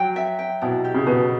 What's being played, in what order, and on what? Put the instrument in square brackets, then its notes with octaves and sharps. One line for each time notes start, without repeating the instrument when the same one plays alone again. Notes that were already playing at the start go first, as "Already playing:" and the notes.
Already playing: [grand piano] F#3 [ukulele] G5
[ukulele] E5
G5
[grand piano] B2 [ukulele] E4
[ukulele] G4
[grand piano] C#3
[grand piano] B2 [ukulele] B4